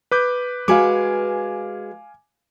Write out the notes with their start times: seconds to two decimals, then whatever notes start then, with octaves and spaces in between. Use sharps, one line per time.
0.11 B4 D6 G6
0.68 G#3 F#4 B4 F5 G#5 D6